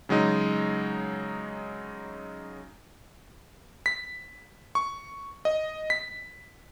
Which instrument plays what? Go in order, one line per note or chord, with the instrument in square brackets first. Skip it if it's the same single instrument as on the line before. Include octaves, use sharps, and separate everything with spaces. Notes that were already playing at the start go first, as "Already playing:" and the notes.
[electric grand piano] C#3 F#3 G#3 D#4
B6
C#6
D#5
B6